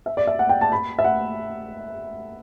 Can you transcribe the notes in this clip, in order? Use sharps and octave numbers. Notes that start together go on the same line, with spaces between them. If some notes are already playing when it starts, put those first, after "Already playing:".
E5
D5
E5
F#5
G5
A5
B5
E5
F#5